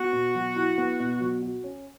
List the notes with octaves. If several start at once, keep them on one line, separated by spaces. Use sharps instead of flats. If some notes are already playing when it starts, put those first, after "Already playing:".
Already playing: B3 F#4
B2
F#3
E4
B3
B2
F#3
F#4
C#4